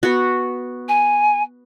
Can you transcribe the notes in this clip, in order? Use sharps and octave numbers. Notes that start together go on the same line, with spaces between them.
B3 F#4
G#5